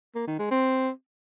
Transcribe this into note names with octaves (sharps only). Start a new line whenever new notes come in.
A#3
D#3
G#3
C4